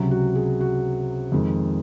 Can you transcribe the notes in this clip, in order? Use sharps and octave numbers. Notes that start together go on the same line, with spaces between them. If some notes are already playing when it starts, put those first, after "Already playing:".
Already playing: C#2 C3 F#3
F#4
G#4
F#4
F2 D#3 G#3